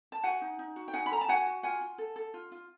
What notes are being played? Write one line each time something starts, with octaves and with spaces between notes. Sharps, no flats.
A5
F#4 F#5 G#5
D#4
D#4
F#4
G5
D#4 F#5 G#5
B5
A4 A#5
A5
F#4 F#5 G#5
F#4
F4 F#5 G#5
F4
A4
A4
F4
F4